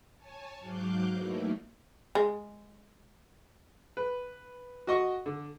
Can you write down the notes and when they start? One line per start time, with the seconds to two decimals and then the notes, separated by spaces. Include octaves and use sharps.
0.17 C#5 G#5 A5
0.59 G#2 F#3 F5 D6 F#6 G6
1.09 E3 F#3 A3 A#3 D#4 E4
2.15 G#3
3.97 B4
4.87 F#4 D#5 C#6
5.26 D3